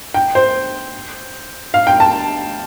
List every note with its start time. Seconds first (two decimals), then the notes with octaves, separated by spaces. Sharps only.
0.14 G5
0.35 C5
1.74 F5
1.87 G5
2.00 A5